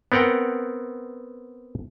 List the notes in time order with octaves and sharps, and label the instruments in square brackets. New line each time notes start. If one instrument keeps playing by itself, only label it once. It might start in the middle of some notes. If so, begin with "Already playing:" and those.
[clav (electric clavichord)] B3 C4 A#4 F#5 G5